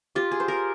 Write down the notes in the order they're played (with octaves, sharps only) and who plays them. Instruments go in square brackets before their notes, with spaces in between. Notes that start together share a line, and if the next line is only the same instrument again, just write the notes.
[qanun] F4 [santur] G4
[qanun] G#4
[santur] C5
[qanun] A#4